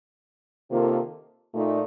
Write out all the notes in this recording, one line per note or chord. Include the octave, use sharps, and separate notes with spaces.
C3 D#3 A#3 F4 A4
A#2 A3 D#4